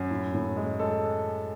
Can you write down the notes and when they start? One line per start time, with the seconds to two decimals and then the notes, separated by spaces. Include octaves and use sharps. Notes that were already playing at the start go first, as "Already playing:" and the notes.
Already playing: F#2
0.11 A2
0.34 A2
0.56 G#3
0.79 G#3 A4